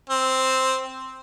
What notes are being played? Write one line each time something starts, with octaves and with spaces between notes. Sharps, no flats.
C4